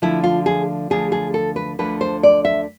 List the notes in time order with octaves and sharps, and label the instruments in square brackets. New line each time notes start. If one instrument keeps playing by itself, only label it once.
[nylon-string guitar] D2 D3 F3 E4
F4
G#4
D2 D3 F3 G#4
G#4
A4
B4
D2 D3 F3 B4
C5
D5
E5